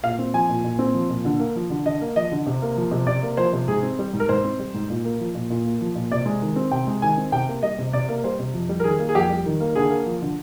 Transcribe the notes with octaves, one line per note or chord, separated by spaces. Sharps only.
A#2 F5
C4
F3 G#5
A#2
A#2
C4
F3
A#2
D3
A#3
F3
D3
D3 D#5
A#3
F3 D#5
D3
C3
A#3
F3
C3
C3 D5
A#3
F3 C5
C3
G#2 G#4
C4
G3
G#2
A#4
G#2 C5
C4
G3
G#2
A#2
A#3
F3
A#2
A#2
A#3
F3
A#2
C3 D5
G#3
D#3
C4
C3 G5
G#3
D#3 G#5
C4
C3 G5
A#3
G3 D#5
C3
C3 D5
A#3
G3 C5
C3
F2
G3
A#4
D#3 G#4
A#3
G#4
F2 G4
G3
D#3
A#3
D3 G#4
A#3
F3
D3